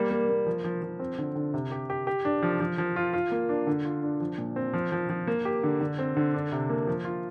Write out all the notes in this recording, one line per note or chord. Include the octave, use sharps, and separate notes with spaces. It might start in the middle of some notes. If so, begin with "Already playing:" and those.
Already playing: G3 A#3
A#3
A#3
F3
F3
F3
C4
D3
D3
C3
G4
G4
G4
D4
F3
F3
F3
F4
F4
A#3
D4
D3
F4
D4
F3
A#2
C4
F3
F3
F3
A#3
G4
D3
D3
C4
D3
D4
C3
A#3
F3
F4